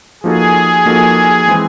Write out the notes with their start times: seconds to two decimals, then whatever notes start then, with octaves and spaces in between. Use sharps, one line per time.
0.23 F3 A#3 D#4 F#4 G#4 A4
0.86 F3 A#3 D#4 F#4 A4
1.48 E3 G#3 C4